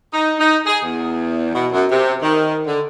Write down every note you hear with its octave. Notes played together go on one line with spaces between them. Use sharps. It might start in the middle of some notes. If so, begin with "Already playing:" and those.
D#4
D#4
G#4
E2
B2
F#2
C3
D#3
D3